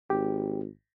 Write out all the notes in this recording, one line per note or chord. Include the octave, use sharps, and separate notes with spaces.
G#1 G4